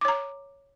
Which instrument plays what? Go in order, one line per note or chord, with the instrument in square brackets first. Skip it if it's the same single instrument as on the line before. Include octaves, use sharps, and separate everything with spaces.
[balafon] D6
C#5
A#5